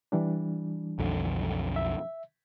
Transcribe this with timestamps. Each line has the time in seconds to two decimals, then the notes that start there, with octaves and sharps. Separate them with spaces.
0.12 E3 G3 D4
0.99 B1 F2 D3
1.76 E5